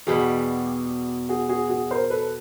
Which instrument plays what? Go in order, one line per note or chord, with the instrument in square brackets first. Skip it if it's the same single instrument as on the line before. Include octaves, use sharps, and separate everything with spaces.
[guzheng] E2 B2 G3 [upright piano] F#4 G#4
[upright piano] F#4 G#4
F#4 G#4
F#4 G#4
A#4 C5
A4 B4